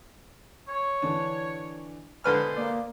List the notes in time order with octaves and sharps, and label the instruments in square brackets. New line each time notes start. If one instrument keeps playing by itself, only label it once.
[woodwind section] C#5
[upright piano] D3 E3 D4
[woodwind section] B2 G#3 C5 [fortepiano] D3 B4 F6
[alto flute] A#3 [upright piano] D5